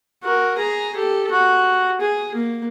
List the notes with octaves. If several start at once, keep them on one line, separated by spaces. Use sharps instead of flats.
F#4 A#4
G#4 A#5
G4 A4
F#4
G#4
A#3